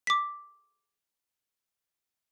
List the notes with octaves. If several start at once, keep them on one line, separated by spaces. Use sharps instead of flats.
D6 B6